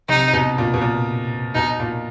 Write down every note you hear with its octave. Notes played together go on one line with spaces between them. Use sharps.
C3 D#4
B2
A#2
B2
A#2
B2 D#4
A#2